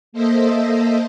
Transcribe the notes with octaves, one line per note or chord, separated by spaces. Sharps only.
A#3 A4 C5 D#5 E5